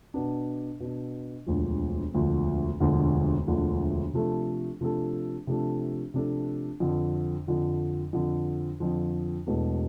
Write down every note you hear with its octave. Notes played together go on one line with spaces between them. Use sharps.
B2 B3 D4
B2 B3 D4
E1 D2 D3 F3
E1 D2 D3 F3
E1 D2 D3 F3
E1 D2 D3 F3
C3 F3 A3 D4 A4
C3 F3 A3 D4 A4
C3 F3 A3 D4 A4
C3 F3 A3 D4 A4
F2 D3 F3
F2 D3 F3
F2 D3 F3
F2 D3 F3
E1 E2 B2 A3